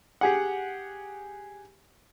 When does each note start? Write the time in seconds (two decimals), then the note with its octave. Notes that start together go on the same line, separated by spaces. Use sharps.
0.21 G4 G#4 F#5